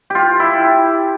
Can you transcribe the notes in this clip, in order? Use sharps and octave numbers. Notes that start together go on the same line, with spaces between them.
F4 G4
E4